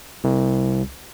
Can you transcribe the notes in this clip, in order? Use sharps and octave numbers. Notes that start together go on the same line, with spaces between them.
C2